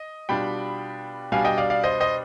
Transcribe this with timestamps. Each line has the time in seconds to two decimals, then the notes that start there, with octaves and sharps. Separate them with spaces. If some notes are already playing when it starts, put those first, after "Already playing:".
Already playing: D#5
0.29 B2 G3 D4 F4 G5 B5
1.32 B2 G3 D4 F5 G#5
1.45 D#5 G5
1.58 D5 F5
1.70 D5 F5
1.84 C5 D#5
2.00 C5 D#5